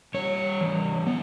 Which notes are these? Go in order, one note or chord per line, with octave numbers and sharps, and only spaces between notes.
G3 C#5
E3
B3